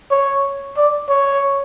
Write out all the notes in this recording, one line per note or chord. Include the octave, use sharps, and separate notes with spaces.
C#5
D5
C#5